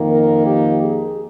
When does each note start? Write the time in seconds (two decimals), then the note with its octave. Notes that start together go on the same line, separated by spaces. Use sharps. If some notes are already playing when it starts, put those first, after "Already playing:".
Already playing: F2 D#3 A#3
0.09 A#4
0.45 G4
0.82 G#4